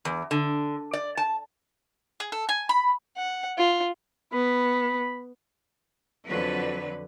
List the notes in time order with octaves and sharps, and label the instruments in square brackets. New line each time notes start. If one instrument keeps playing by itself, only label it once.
[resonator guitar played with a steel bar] E2
D3
D5
A5
[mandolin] G#4
A4
G#5
B5
[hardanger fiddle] F#5
F4
[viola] B3 [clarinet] B5
[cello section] F2 D3 F#3 B4